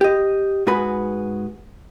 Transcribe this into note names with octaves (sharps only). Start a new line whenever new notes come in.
G4 D#5
G#2 F#4 G#4 B4 B5